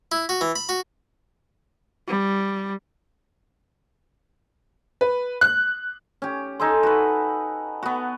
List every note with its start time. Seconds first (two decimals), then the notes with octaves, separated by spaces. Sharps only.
0.12 E4
0.29 F#4
0.41 E3
0.56 B5
0.69 F#4
2.08 G3
5.01 B4
5.41 F#6
6.22 C#4 G4
6.60 D#4 A4 G#5 C6
6.83 F#4 B4
7.83 B3 F#4